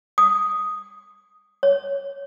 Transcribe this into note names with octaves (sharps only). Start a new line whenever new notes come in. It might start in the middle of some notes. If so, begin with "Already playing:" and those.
D#6
C#5